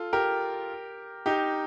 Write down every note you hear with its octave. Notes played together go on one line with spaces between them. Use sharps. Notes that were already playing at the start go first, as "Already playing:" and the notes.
Already playing: F4 A4
G4 A#4
D#4 G4